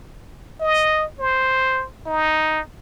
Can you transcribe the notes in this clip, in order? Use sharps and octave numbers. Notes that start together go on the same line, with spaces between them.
D#5
C5
D#4